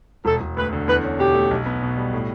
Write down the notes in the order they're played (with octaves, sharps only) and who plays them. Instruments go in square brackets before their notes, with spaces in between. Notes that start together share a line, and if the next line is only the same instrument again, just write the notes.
[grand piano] E1 [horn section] A4
[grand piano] E1
[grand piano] D2 [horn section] B4
[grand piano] D3
[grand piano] E2 [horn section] B4
[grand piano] C#4
[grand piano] B2 [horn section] G4
[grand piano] A3
B1
B3
B2
G3
A2